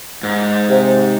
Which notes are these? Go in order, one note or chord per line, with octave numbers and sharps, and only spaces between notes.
G#2
C3